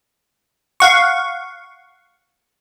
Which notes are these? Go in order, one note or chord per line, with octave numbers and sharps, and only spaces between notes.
F5 F#5 C#6